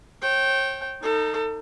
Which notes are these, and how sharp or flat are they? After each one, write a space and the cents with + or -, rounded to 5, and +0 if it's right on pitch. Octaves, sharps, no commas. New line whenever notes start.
C#5 -40 G5 -10
D#4 +0 A4 +30